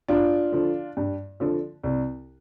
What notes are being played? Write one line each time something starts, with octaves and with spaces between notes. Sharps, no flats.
G2 D4 F4
D3 F3
G2
D3 F3
C2